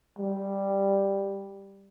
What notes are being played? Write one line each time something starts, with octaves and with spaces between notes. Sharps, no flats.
G3